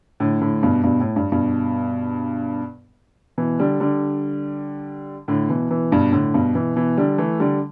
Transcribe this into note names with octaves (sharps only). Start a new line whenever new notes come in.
A2 D3
A2 D3
G2 B2
G2 B2
A2
G2
G2 B2
B2 E3
D3 G3
D3 G3
A2 D3
B2 E3
B2 E3
G2 B2
A2 D3
G2 B2
B2 E3
B2 E3
D3 G3
E3 A3
D3 G3